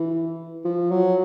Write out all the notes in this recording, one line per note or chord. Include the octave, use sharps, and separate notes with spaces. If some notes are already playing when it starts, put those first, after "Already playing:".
Already playing: E3
F3
F#3